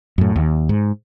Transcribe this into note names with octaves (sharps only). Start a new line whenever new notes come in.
F#2 A2
D#2
G#2